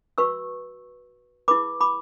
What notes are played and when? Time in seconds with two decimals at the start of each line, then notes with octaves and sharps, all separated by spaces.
0.18 F#4 B4 C#6 E6
1.48 E4 G#4 B4 B5 D6
1.81 B5 D6